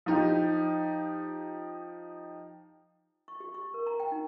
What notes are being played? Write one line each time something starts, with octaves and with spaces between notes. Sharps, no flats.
F3 D#4 G4
C#6
G4
C#6
A#4
A#5
G5
D#4